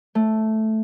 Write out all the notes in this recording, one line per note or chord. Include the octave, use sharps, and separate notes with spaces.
A3